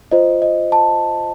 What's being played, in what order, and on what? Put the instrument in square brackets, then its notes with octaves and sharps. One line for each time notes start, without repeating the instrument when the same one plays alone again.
[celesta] F4 C5 D#5
D#5
A5